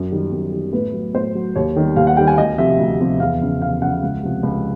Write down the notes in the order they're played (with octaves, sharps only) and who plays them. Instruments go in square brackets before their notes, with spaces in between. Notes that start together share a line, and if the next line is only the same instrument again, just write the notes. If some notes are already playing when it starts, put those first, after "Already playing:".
Already playing: [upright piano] F#2
D#3 G3
F#2
D#3 G3
A2 B4
F#3
A2 C5
F#3
D#2 C#5
D#3 G3
D#2 F5
F#5
D#3 G3 G5
G#5
D2 D#5
C3 F3 E5
D2
C3 F3
E2 F5
C#3 F3
E2 F5
C#3 F3 F#5
C#2
C3 F3
C#2